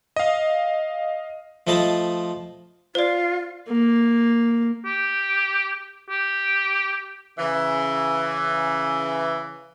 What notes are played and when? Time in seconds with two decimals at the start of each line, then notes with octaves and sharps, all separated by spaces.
0.16 D#5 F5
1.67 F3 A3 C5 D#5 A5 B5
2.95 F4 C5 D5
3.68 A#3
4.86 G4
6.10 G4
7.39 C#3 E3